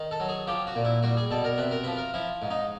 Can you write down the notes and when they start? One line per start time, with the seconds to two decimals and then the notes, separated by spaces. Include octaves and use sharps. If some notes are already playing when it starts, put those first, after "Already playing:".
Already playing: D#3
0.11 A4
0.20 F#3
0.29 G#4
0.47 F3 G4
0.67 F#4
0.75 A#2
0.85 E4
1.03 G3 F#4
1.17 G#4
1.31 B2 A4
1.44 A#4
1.58 C3 B4
1.71 A#4
1.84 F3 B4
1.97 A#4
2.14 F3 E4
2.42 G#2
2.51 D#4